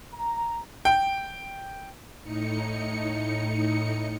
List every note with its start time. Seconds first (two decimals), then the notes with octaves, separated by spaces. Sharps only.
0.13 A#5
0.85 G5
2.22 A2 D#4 C#7